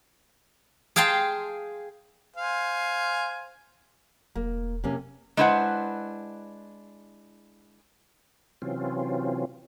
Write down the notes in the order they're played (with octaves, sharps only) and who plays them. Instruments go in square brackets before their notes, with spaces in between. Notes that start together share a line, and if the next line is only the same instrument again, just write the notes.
[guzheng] G#4 F5 G5 A5 C6
[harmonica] C5 F5 G#5
[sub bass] E1 [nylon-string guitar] A#3
[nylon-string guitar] C3 A#3 C#4
[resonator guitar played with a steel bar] G#3 D4 E4 B4 C5 F#5
[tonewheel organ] C3 E3 F#3 C4 C#4 F4